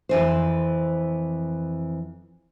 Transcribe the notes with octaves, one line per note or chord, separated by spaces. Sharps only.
F2 E3 C5